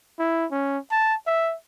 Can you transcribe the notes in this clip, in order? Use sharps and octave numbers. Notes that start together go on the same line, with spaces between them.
E4
C#4
A5
E5